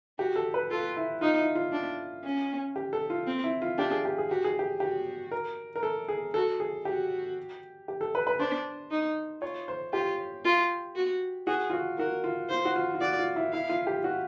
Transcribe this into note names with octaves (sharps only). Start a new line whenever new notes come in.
F#4 G4
A4
B4
F4 A4
E4
D#4 F4
E4
F4
D4
C#4
G4
A4
F4
C4
E4
F4
D4 G4
G#4
G4
G#4
F#4 G4
G#4
G4
F#4 G4
A#4
A#4
A4
G#4
F#4 A4
G#4
F#4 G4
G4
A4
B4
B4
D4 C5
D#4
F4 C#5
C5
F4 G4
F4
F#4
F#4 G#4
F4
F#4
F#4 A#4
F4
F4 C5
F#4
F4
F4
F#4 D5
F4
E4
E4 F5
F4
G4
F#4